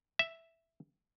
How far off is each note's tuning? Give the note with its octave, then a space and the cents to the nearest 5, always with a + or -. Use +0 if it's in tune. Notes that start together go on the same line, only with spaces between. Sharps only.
E5 +0